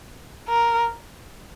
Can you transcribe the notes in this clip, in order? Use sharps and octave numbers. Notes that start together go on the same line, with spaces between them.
A#4